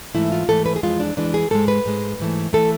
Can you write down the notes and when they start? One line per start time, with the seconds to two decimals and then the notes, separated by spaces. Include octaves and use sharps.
0.14 G#2 E3 A3 E4
0.32 F4
0.49 G#2 E3 A3 A4
0.66 B4
0.76 G#4
0.83 F2 E3 G#3 F4
1.00 D4
1.17 F2 E3 G#3 D4
1.34 G#4
1.50 G#2 G#3 A4
1.68 B4
1.85 G#2 G#3
2.19 G#2 E3 A3
2.53 E3 A3 A4